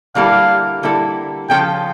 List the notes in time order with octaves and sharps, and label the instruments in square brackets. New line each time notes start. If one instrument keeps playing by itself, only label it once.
[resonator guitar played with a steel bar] D3 G3 A#3 E4 A4 [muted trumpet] F5
[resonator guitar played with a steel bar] D3 G3 A#3 E4 A4
[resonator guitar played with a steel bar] C#3 F3 C#4 F4 A4 [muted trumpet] G5